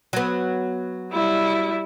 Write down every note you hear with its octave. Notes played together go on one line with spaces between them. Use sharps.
F#3 B3
G3 E4